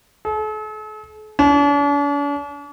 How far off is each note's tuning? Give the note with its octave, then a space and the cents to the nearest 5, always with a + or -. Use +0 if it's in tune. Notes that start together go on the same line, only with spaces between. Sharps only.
A4 -45
D4 -45